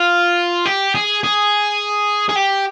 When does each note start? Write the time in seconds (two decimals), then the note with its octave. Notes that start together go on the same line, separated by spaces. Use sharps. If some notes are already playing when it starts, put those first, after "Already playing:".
Already playing: F4
0.66 G4
0.95 G#4
1.23 G#4
2.29 G#4
2.36 G4